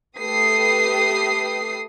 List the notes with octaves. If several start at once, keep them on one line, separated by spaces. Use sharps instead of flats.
A3 G4 B4 D#6 C7